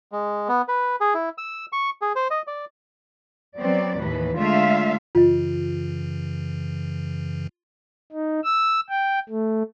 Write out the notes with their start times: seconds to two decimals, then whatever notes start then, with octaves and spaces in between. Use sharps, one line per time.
0.12 G#3
0.49 B3
0.68 B4
1.01 G#4
1.14 E4
1.38 E6
1.73 C#6
2.02 G#4
2.16 C5
2.31 D#5
2.47 D5
3.58 F#3 B3 C4 D5
3.98 D#2 A2 E3 B4
4.36 D3 G#3 A3 F4 E5 F5
5.15 F#2 C#3 E3 F4 D#5
8.12 D#4
8.44 E6
8.89 G5
9.29 A3